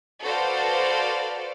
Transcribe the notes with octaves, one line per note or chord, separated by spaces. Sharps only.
F#4 A4 B4 C5 D5 F5